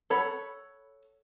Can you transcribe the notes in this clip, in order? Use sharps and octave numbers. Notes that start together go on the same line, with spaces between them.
A4 C#5 F#5 B5